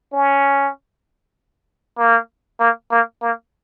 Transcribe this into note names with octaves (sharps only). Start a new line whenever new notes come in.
C#4
A#3
A#3
A#3
A#3